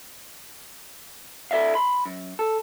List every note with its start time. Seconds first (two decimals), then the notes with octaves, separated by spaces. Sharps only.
1.51 E4 A4 D5 E5 F5
1.75 B5 C6
2.05 F#2
2.39 A4